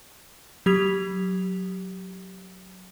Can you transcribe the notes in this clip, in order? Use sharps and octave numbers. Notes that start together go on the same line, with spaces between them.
F#3 G4 D#6 G#6 B6 F7